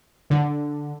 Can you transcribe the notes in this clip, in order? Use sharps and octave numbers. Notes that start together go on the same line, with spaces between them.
D3